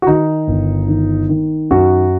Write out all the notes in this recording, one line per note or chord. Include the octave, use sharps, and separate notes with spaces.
F#4
D#3 D#4
G1
D#3
D#3
F#2 F#4